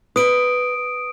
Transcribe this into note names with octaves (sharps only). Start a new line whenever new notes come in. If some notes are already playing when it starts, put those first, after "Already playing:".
B4 D#6 D7